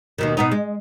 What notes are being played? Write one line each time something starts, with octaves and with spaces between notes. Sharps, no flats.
D#2 B2 D#3
B2 B3 D#4
G#3